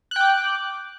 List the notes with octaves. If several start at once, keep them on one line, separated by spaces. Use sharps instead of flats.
G5 D6 F#6